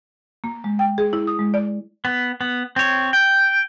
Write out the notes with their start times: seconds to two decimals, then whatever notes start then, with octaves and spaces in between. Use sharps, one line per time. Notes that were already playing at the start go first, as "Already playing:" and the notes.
0.44 A#3
0.64 G#3
0.79 G5
0.98 G#4
1.13 E4
1.27 D#6
1.39 G#3
1.54 D5
2.05 B3
2.41 B3
2.76 C4 C#5
3.13 G5